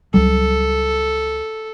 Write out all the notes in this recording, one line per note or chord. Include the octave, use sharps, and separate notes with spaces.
C#2 F#3 G3 A4